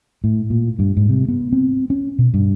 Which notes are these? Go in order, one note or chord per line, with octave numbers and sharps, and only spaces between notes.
A2
A#2
G2
G#2
C3
B3
C4
C#4
B2
G2